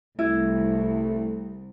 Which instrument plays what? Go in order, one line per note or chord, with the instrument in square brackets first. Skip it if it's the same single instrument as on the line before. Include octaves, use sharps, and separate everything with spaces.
[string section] C2 [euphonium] A3 [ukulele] E4